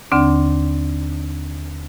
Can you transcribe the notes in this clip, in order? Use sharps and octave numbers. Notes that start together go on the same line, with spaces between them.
D#2 D3 C4 D4